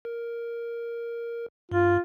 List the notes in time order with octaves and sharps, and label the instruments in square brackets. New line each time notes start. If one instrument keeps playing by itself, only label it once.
[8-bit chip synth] A#4
[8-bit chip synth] G2 [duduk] F4